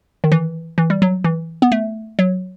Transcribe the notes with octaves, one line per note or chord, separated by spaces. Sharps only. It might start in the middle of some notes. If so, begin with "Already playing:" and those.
D#3
E3
E3
G3
F#3
E3
B3
A3
F#3